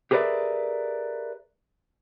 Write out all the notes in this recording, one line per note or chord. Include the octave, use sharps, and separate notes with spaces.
G4 G#4 A#4 B4 D5 E5